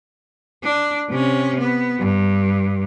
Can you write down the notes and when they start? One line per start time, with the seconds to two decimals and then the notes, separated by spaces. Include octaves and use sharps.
0.64 D4
1.10 C3 C#4
1.60 B3
1.99 G2